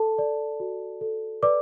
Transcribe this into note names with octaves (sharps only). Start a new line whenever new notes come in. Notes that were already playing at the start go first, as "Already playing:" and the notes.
Already playing: A4 A5
D5
F#4
A4
B4 D5 D6